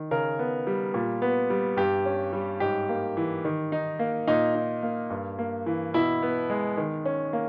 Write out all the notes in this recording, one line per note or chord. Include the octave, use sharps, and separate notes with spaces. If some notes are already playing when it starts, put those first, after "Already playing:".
Already playing: D#3
C#3 A#4
B3
G3
A#2
B3
G3
G2 G4
C#4
G3
G#2 G4
A#3
E3
D#3
D#4
A#3
A#2 D#4
D#4
A#3
G2
A#3
E3
B2 E4
B3
G#3
D#3
C#4
A#3